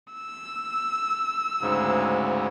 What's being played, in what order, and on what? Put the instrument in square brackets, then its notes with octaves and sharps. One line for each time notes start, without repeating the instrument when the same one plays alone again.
[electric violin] E6
[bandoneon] D2 G#2 C#3